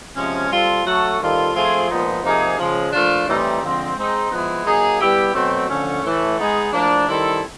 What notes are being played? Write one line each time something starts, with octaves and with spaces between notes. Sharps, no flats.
C3 F3 G#3 C#4
G3 C4 F4 A4
F#3 A3 C#4 F#4 A4
D#3 G3 C4 F4 A4
F3 A3 C4 F4 G#4
A#2 F3 G#3 B3 D#4
C3 F3 A#3 D#4 G#4
C#3 F3 G#3
A#2 F3 A3 D4 F4
A2 E3 G3 C4 D#4
D3 F3 G#3 C4
G#3 C4 D#4
F3 G#3 B3 E4
F#3 A#3 D#4 G#4
G3 B3 E4 G4
B2 F#3 A3 C4
D3 F3 A3 C#4
A2 E3 A3
G#3 B3 D#4 G#4
A2 F3 A#3 D4
D#3 G3 C4 E4 A4